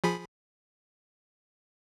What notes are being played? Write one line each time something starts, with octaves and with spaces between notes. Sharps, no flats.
F3 G#4 B5